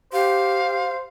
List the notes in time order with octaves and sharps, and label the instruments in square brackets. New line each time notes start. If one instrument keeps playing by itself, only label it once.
[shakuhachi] G4 [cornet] C5 [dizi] F5